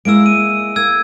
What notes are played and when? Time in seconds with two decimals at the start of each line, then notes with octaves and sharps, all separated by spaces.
0.05 G#3 A#3 E4 E6 D7
0.26 D#7
0.76 A#3 E6 G#6